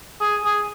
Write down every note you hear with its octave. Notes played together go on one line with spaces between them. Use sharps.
G#4
G#4